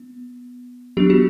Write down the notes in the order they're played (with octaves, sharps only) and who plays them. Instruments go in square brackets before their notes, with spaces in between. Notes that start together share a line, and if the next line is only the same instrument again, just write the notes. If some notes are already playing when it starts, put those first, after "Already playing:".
Already playing: [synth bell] B3
F#3 B3 D4 G4
F#4